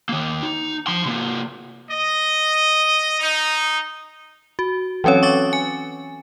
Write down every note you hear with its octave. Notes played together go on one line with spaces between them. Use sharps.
D#3 A#3
D#4
F3 C6
C3 A#3
D#5
D#4
F#4
E3 F#3 C4 C#4 C#5
C#6 D6 A6
G#5